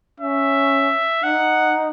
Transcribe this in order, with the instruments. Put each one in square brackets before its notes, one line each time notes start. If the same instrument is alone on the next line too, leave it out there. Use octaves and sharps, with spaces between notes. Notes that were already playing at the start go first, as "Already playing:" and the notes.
[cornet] C#4 [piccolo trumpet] E5
[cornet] D#4 [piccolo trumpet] F#5